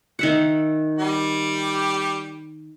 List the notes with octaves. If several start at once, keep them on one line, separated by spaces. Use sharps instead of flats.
D#3 E5 F#5
G3 G4